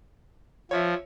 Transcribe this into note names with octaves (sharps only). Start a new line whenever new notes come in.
F3 C#5 E5